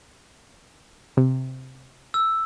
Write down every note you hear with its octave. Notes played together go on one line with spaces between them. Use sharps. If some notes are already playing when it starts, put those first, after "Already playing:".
C3
E6